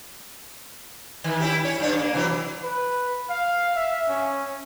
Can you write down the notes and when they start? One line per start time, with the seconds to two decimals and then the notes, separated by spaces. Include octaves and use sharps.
1.24 D#3
1.40 C#4 E4 G4
1.64 C#4 C#5
1.80 G2 D4 C#5
1.99 A#3
2.14 C3 E3 F#3
2.64 B4
3.30 F5
3.76 E5
4.09 C#4